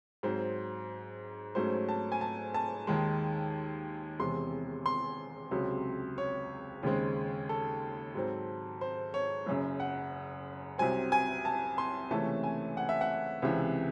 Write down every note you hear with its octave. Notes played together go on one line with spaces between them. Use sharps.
G#2 F#3 C4 C5
G#2 F#3 A3 C#4 C5
A5
G#5
A5
A5
D#2 D#3 G#3
E1 E2 C3 C6
C6
C#2 C3 F#3
C#5
D#2 C#3 G#3 C4
A4
G#2 F#3 C4
C5
C#5
F#1 F#2 C#3
F#5
C2 C3 F#3 C4 G#5
G#5
A5
C6
C#2 C3 E3 A3 C#4 A5
G#5
F#5
E5
F#5
C#2 C3 E3